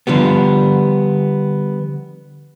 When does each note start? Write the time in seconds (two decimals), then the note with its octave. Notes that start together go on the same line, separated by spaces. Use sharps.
0.07 D3 F3 G3 B3